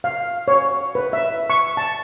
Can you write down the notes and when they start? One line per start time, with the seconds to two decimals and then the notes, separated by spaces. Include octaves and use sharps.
0.04 F5
0.48 C#5
0.95 B4
1.13 E5
1.50 C#6
1.77 A5